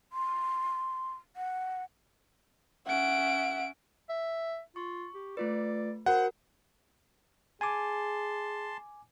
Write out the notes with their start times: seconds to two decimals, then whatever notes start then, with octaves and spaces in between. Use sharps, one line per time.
0.13 C6
1.36 F#5
2.87 C#4 E5 F#5 D7
4.09 E5
4.76 F4 C#6
5.15 G4
5.37 A3 F4 B4 D5
6.06 F#4 A#4 C5 F#5
7.61 G#4 G#5 A5 C6 D6